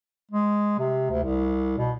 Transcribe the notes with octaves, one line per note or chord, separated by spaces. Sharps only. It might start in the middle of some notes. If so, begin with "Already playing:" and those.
G#3
C3
D2
C2
B2